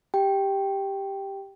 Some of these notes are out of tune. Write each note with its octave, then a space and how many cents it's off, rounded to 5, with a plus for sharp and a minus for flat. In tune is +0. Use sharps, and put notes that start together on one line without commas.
G4 +0 G5 +0